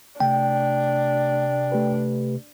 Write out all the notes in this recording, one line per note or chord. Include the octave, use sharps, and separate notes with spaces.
C3 A3 D4 G5
A3 G4 B4